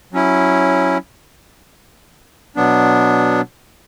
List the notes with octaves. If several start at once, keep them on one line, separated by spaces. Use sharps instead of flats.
F#3 C#4 E4
B2 F#3 B3 D4